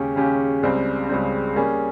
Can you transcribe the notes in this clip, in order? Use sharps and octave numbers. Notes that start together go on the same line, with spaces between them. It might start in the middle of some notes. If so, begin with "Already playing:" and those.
Already playing: D#2 C#3 G#3 C#4 G4
D#2 C#3 G#3 C#4 G4
C#2 C#3 G3 C4
C#2 C#3 G3 C4
G3 A#3 C#4 G#4